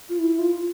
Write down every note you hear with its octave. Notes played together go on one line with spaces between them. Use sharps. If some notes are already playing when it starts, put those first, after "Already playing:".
F4
E4
F4